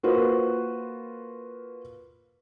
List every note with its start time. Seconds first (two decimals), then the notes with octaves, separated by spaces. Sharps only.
0.03 A#3 F4 F#4 B4 C5